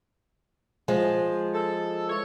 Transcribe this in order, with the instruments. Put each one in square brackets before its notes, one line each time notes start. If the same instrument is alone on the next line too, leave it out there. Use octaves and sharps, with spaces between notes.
[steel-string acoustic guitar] F3 G#3
[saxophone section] A4
E3 C#5